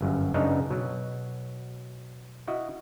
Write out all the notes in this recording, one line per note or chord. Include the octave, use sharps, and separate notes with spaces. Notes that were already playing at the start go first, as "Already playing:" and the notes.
G1 F#2
F#2 C#3 B3 D4 D#4 C#5
B2 F#3
E4 F#4 D#5